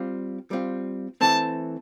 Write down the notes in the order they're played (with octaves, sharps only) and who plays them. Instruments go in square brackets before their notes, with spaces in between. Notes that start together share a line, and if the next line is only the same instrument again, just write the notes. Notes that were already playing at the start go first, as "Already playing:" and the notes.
Already playing: [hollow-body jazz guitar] G3 C4 F4
G3 C4 F4
[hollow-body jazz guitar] E3 A3 C4 [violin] A5